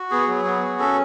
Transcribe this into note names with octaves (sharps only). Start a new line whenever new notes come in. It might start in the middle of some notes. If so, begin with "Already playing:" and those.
Already playing: F#4
B3 G#4
F#3
B3
F#4
C#4 A4